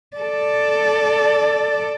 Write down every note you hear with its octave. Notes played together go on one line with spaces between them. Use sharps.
A4 D5